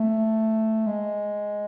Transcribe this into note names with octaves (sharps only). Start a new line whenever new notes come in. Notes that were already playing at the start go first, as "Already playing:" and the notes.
Already playing: A3
G#3